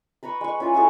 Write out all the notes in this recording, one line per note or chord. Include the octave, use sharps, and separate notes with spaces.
B4 A#5 B5 C#6
G#3 C#6
C#4 E4 F4 G#4
E4 F#4 G#4 A4